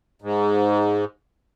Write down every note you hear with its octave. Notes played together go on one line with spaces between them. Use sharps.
G#2